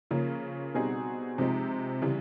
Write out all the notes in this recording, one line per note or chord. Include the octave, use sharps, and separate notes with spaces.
C#3 F3 A#3 C#4
B2 G3 C4 D#4 G#4
C3 F3 G#3 C4 D#4
C#3 E3 G3